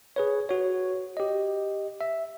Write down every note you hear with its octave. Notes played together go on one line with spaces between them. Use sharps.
G#4 B4 C#5
F#4 C#5
G4 D#5
E5